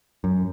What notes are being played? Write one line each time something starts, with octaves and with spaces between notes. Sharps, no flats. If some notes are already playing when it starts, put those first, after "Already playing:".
F#2